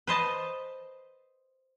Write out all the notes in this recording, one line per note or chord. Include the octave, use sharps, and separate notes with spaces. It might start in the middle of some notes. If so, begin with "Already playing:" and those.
B4 C5 D#5 A5